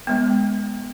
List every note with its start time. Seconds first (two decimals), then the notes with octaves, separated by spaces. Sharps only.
0.07 G#3 B3